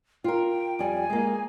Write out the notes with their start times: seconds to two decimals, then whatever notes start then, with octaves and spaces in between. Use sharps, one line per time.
0.24 F4 A#4 G5
0.79 F2 G3 G#5
1.10 G#3 A#3